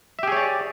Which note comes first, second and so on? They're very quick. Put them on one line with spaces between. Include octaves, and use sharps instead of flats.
E5 G4 G#4 C#5 D5